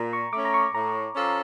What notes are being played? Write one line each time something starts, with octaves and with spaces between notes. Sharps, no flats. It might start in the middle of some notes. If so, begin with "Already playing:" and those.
Already playing: A#2 A#5
C#6
A3 C#4 D6
A#5
C#6
A2 A#5
F3 C#4 F4 A4